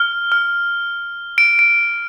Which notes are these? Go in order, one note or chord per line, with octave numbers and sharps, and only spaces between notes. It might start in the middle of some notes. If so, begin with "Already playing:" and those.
Already playing: F6
F6
D7
D7